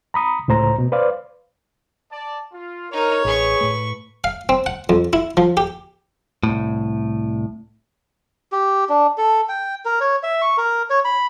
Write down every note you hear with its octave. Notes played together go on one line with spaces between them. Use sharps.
A#5 B5 D#6
C#2 A2 C5 A#5
B2
B4 C5 D5 F5
D5 A5
F4
D#4 A#4 C#5 A#5
A1 G#4 B4 C#6
A2 A3
F5
C4
F#5
F2
E4
F3
G4
C2 A2
G4
D4
A4
G5
A#4
C#5
E5
C#6
A#4
C#5
B5